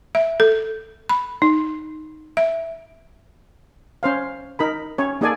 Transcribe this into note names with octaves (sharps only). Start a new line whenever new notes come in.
E5
A4
B5
D#4
E5
C#4 C5 F5
D#4 A#4 B5
C#4 C#5
A#3 D#4 G#4 A4 D5 G#5